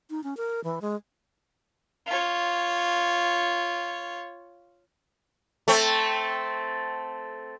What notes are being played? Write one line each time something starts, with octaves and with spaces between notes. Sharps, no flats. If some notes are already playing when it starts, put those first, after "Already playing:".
D#4
C#4
A#4
E3
G#3
F4 C#5
A3 C4